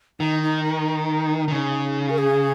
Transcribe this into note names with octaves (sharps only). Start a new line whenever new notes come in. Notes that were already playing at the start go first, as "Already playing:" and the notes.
D#3 D#4
D#4
D#4
D#3
C#3
A#4
G#4